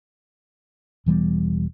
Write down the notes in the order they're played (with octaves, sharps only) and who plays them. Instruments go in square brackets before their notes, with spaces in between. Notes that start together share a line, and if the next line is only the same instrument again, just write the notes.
[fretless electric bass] E1 E3 G3 B3